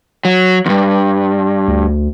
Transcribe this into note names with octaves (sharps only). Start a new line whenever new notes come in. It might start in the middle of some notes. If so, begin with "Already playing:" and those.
F#3
E2 G2
D2